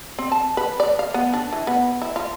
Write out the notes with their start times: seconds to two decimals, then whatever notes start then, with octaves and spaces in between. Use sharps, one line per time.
0.18 C4
0.32 A5
0.57 B4
0.80 D5
0.99 F5
1.14 B3
1.34 D4
1.53 E3
1.67 B3
2.02 E4
2.16 F4